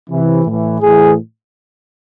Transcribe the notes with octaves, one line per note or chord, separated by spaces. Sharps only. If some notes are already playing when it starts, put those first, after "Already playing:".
C3 E3
A2 E3
A2 E3 G#4